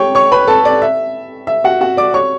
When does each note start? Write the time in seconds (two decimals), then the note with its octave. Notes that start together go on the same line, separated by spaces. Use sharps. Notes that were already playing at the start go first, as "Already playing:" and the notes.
Already playing: G4 C#5 G5 C#6
0.15 C#5 C#6
0.32 B4 B5
0.48 A4 A5
0.65 D5
0.82 E5
1.47 E5
1.64 F#4 F#5
1.81 F#4 F#5
1.97 D5 D6
2.14 C#5 C#6